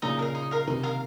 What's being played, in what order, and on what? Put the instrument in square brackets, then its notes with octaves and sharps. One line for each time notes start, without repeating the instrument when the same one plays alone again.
[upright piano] A#2 C#3 [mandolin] D#4
[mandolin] A#4 F5
D#4
A#4 F5
[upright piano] C3 D#3 [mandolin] D#4
[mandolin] A#4 F5